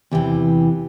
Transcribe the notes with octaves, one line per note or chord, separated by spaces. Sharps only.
E2 C3 E3 G4